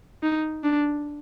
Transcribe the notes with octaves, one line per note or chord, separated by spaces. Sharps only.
D#4
D4